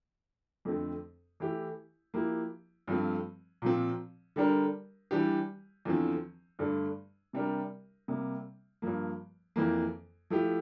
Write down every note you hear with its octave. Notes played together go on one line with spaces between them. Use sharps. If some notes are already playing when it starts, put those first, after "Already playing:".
F2 D3 A3 C4
E3 A3 E4 G4
F3 A#3 E4 G4
G2 F3 A3 C4
A#2 F3 C4
D3 G3 D4 G4 A#4
E3 G3 D4 G4
E2 D3 F3 C4
G2 D3 A3 D4
C3 G3 D4 G4 A#4
C3 G3 A#3
G2 F3 A#3
F2 E3 A#3
F3 A3 E4 G4